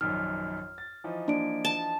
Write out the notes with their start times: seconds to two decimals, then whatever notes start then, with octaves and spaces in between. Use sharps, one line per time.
0.01 A#1 F#2 D#3 F6
0.78 A6
1.04 E3 F3 D#4
1.28 A#3 D4 D5 D7
1.65 A5